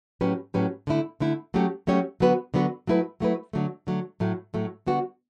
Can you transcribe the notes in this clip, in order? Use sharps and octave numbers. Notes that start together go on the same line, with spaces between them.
A2 F#3 C#4 G4 B4
A2 F#3 C#4 G4 B4
D3 A3 E4
D3 A3 E4
F#3 A3 C#4 G4 C#5
F#3 A3 C#4 G4 C#5
D3 F#3 B3 F#4 B4
D3 F#3 B3 F#4 B4
F#3 A3 E4 B4
F#3 A3 E4 B4
D3 F#3 A3
D3 F#3 A3
A2 F#3 A3
A2 F#3 A3
D3 G3 B3 F#4